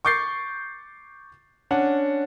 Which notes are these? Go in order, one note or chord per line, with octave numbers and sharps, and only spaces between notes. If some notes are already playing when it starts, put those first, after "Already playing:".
C#6 D6 G6 A6 C7
C#4 D4 F#5